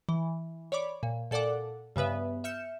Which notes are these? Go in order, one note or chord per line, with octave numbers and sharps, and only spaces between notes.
E3
C#5 D5 B5 D6
A#2
A#2 A4 D5 F#5 D6
G2 C#3 B3 B4 E5
E5 F6 G6 C#7 E7